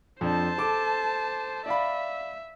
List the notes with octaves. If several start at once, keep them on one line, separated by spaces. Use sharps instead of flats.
F2 D4 C5 A5
A4 D6
D5 E5 F5 B5